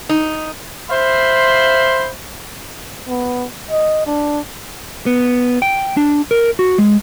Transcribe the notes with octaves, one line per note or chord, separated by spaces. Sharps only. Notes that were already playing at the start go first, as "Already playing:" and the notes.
D#4
C5 E5 F5 B5 C6
B3
D#5
D4
B3
G5
D4
A#4
F#4
G#3